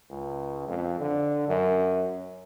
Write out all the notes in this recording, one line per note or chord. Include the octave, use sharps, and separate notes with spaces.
C#2
F2
D3
F#2